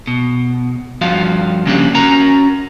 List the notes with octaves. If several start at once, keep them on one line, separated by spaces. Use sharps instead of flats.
B2
G2 F3 F#4 F5
C#3 A#3 C#4 D4 G4
C#4 F#4 A#4 A#5